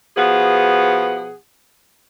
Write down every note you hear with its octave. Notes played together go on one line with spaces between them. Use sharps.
B2 F3 B3 G#4 F#5